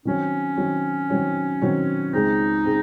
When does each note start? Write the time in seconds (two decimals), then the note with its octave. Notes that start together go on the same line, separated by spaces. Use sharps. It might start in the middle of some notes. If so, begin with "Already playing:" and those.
0.05 D#3 F#3 C4 C#4 F#4 C#5
0.57 D#3 F#3 C4 F#4 C#5
1.10 D#3 F#3 C4 F#4 C#5
1.62 D#3 F#3 C4 F#4 C#5
2.13 C#2 C#3 G#3 C4 D#4
2.65 C#3 G#3 C4